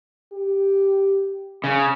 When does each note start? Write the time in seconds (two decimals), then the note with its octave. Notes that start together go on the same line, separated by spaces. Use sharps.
0.33 G4
1.64 C#3